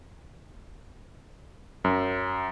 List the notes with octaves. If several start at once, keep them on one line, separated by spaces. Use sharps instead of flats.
F#2